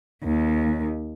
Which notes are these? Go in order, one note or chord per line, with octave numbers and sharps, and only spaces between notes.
D#2